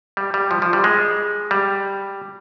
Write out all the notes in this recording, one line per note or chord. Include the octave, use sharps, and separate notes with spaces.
G3
G3
F3
F3
G3
G#3
G3